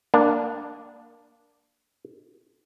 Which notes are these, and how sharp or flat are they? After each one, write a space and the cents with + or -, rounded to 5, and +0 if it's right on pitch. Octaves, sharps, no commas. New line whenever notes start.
A#3 +0 D4 +0